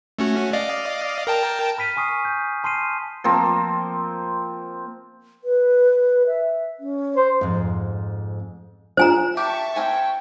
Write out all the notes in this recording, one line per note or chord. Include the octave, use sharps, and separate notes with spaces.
A3 C#4 F#4
D5 D#5 F5
A#4 G5 A5
B5 F6 B6 D#7
G#5 C#6 D#6 C7 D#7
G6
A5 C6 F6 C7 D#7
F3 A#3 C4
B4
E5
C#4
C5
F2 G#2
D4 F4 G#4 C5 G#5 A#5
G4 E5 A5 C#6
C4 A#4 G5 G#5